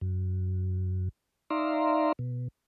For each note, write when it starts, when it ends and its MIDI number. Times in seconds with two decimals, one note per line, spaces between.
0.01 1.09 42
1.50 2.12 63
1.50 2.12 74
1.50 2.12 76
1.50 2.12 77
1.50 2.12 82
1.50 2.12 84
2.19 2.48 47